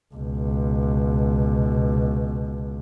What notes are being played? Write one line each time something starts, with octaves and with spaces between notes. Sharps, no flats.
C#2 B2